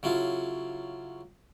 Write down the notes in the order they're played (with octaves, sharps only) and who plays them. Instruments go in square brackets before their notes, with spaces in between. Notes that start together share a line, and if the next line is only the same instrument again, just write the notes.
[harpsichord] C#3 F#3 E4 F4